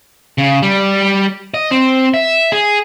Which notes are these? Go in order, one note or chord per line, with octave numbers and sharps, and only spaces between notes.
C#3
G3
D#5
C4
E5
G#4